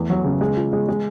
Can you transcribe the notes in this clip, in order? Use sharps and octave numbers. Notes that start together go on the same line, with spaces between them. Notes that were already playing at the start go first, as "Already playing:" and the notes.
Already playing: E2 A3
F#3
C#3
G#3
F4
G#3
G#3